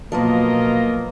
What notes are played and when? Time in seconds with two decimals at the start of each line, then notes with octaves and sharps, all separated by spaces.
0.12 B2 F3 F#3 A#3 B3 F4 A#4 D#5